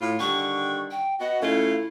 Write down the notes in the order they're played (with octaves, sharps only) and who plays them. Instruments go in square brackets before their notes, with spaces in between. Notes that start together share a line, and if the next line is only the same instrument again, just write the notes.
[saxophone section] A2 F4
[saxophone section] D3 D#3 G3 [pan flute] C#6
[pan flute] G5
[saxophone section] B3 F#4 [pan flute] D#5
[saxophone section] C#3 A3 F4 [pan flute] E4